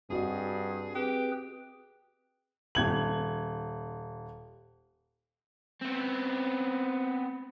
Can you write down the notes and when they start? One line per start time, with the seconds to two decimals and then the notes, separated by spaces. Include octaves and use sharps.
0.10 G2 C4 F#4 G#4 D#5
0.95 C4 G4 G#4 B4
2.75 D#1 G#6 F#7
5.81 B3 C4